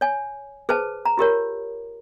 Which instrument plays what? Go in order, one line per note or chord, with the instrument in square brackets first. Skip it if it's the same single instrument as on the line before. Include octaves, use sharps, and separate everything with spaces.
[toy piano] C#5 G#5
G#4 B4 C5 A5
A#5
F4 G4 A#4 C#5